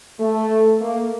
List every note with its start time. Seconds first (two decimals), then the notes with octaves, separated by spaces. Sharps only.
0.20 A3
0.81 A#3